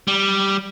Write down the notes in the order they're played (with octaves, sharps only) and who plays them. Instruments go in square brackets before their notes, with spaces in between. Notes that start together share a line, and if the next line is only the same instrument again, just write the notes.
[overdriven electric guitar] G3